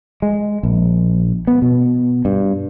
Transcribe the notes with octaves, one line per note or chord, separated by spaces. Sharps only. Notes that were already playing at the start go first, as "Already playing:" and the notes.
G#3
A#1
B3
B2
G2